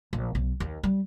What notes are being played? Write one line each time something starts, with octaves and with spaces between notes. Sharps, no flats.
A#1
B1
D#2
G3